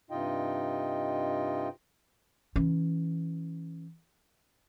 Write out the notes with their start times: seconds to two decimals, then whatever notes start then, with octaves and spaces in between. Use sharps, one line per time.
0.11 G2 C3 D#4 F4 D#5 G5
2.56 E3 C#4